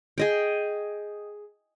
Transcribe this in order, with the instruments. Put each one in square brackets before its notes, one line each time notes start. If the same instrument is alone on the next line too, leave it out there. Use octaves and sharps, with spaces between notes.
[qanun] G#4 D#5 G5